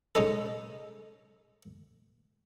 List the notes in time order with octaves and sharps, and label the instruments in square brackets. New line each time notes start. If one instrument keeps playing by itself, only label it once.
[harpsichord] G#3 C#4 D#4 A4